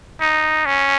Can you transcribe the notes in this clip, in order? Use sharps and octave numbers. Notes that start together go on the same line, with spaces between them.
D#4
C#4